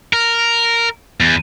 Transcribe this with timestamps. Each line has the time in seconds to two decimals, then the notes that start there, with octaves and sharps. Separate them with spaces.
0.13 A#4
1.20 E2